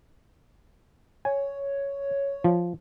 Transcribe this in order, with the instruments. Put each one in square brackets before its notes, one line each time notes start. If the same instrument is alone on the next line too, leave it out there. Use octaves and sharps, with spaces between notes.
[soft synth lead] C#5 [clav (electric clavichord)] G#5
[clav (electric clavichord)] F3